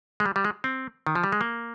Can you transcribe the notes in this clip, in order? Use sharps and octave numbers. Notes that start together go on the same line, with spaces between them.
G#3
G3
G3
G#3
C4
D#3
F3
G3
G#3
A#3